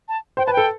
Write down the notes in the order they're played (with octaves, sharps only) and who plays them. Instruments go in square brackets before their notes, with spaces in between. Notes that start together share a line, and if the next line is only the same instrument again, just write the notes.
[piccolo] A5
[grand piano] C5 [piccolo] G5
[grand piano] B4 [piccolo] A5
[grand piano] A4 [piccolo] G5